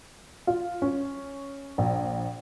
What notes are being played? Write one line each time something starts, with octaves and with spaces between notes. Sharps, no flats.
F4
C#4
A#1